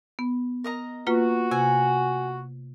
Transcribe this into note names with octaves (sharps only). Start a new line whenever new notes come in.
B3
A#4 D#5 A#5
A#3 F4 F#4 B4
C3 G#5